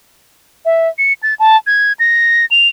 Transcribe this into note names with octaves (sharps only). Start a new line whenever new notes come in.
E5
C#7
A6
A5
G#6
A#6
F7